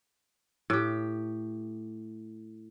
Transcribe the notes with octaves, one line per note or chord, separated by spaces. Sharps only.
A2 G4